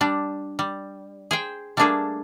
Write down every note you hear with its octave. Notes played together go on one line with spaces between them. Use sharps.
G3 D4
G3
G#4 C5 G5
G3 A3 A#3 D4 G#4 A4